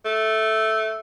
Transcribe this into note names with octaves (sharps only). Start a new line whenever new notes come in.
A3